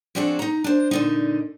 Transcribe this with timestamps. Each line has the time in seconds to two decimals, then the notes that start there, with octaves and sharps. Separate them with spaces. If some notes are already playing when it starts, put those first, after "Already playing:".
0.15 F3 C4 D4 F#4 G#4 A4
0.39 D#4 A#5
0.64 D4 C5
0.91 A#2 D3 D#4